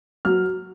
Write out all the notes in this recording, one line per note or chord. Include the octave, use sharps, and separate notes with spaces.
F#3 F6